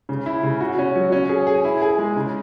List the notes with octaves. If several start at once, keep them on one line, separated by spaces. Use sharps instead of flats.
C#3
E4
C#3
F#4
C#4
F#3
C#4
G#4
G#4
E4
G#4
G#3
C#3